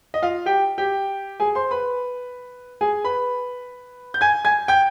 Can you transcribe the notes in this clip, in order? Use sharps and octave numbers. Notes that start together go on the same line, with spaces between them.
D#5
F4 F5
G4 G5
G4 G5
G#4 G#5
C5 C6
B4 B5
G#4 G#5
B4 B5
G6
G#5 G#6
G#5 G#6
G5 G6